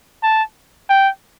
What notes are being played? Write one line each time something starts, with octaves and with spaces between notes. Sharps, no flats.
A5
G5